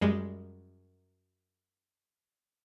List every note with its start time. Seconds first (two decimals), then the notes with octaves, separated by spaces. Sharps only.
0.01 F#2 G3 G#3